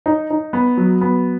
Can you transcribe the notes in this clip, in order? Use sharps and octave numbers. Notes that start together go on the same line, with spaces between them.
D#4
D#4
B3
F#3
B3